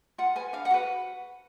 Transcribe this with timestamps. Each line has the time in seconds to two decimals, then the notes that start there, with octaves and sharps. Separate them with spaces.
0.18 F4 F#5
0.36 B4 G#5
0.53 D4 F5
0.65 F#5
0.71 F#4 B4